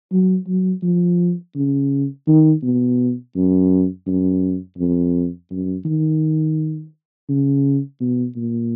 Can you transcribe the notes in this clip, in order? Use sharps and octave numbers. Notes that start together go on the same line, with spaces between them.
F#3
F#3
F3
C#3
D#3
B2
F#2
F#2
F2
F#2
D#3
C#3
B2
A#2